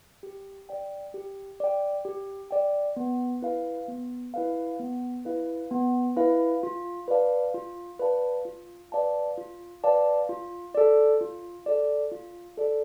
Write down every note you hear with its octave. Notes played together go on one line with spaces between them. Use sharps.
G4
D5 G5
G4
D5 G5
G4
D5 G5
B3
E4 B4 F5
B3
E4 B4 F5
B3
E4 B4 F5
B3
E4 B4 F5
F4
B4 D5 F5 A5
F4
B4 D5 F5 A5
F4
B4 D5 F5 A5
F4
B4 D5 F5 A5
F4
A4 D5
F4
A4 D5
F4
A4 D5